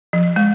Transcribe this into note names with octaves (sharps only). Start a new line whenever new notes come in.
F3
G#3